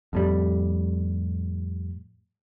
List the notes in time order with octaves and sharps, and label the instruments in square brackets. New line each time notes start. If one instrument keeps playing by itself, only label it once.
[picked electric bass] F2 A2 G3